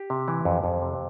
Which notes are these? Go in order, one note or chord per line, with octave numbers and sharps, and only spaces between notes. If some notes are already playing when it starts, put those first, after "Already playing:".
Already playing: G4
C3
E3
F2
F2
C3